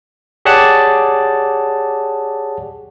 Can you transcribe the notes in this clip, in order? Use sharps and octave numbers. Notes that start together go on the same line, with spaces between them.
G4 G#4 C#5 D5 F#5 A5